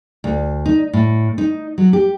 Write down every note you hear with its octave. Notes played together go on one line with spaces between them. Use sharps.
D2
D#4
A2
D#4
F#3
G4